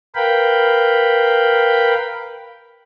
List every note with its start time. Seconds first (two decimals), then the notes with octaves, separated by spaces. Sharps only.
0.15 A#4 B4 F5 G5 B5